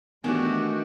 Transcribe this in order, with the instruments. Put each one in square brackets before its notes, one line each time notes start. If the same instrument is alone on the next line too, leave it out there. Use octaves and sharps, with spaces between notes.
[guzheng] D#3 E3 D4 [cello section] A3 [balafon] B3 [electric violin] F#4 G4